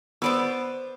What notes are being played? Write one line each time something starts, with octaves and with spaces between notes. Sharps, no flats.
B3 C5 D5 B5 D6 E6